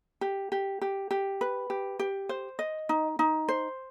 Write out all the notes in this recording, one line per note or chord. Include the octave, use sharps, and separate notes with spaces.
G4
G4
G4
G4
B4
G4
G4
C5
D#5
D#4
D#4
C5